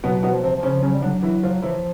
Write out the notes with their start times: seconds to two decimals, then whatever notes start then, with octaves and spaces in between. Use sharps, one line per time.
0.04 B2 F#3 B3
0.23 B2 B3
0.30 F3
0.43 C3 C4
0.56 F3
0.63 C#3 C#4
0.83 C#3 F#3 C#4
0.93 G3
1.02 D3 F#3 D4
1.22 E3 E4
1.43 F3 F4
1.63 E3 F3 E4